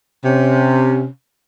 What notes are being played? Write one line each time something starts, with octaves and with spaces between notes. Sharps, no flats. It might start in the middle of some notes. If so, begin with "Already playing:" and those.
C3 C#4